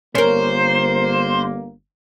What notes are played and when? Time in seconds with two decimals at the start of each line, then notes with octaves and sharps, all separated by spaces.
0.15 G1 A#3 C#4 A#4 C5